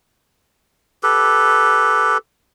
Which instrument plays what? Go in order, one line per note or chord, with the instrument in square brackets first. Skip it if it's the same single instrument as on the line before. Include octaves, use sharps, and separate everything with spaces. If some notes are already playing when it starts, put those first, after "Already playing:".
[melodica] G4 A4 B4